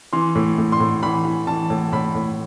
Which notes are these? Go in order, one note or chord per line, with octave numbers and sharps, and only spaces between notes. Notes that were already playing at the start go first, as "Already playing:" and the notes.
E3 C6
A2
A2
C6
A2
E3 B5
E3
E3 A5
A2
A2 B5
A2